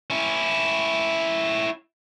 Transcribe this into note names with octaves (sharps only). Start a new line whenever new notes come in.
C#4 E4